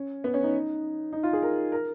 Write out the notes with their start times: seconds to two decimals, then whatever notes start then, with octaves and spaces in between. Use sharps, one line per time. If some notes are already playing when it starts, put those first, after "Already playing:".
Already playing: C#4
0.24 B3
0.34 C#4
0.44 D#4
1.13 D#4
1.23 F4
1.33 G#4
1.42 A#4
1.72 A#4